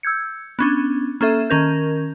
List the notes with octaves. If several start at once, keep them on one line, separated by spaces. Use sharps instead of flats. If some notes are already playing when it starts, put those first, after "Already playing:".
E6 G6 G#6 C#7
B3 C#4 D4
A#3 C#4 A4 E5
D#3 C#4 A#4 G6